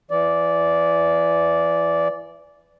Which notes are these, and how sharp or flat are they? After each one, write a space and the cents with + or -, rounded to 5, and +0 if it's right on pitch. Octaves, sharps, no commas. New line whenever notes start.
E3 +25 D5 -10